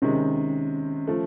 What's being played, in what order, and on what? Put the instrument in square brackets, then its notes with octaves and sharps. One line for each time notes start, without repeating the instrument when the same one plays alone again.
[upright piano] C3 D#3 G#3 [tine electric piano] C#4
[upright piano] F3 A3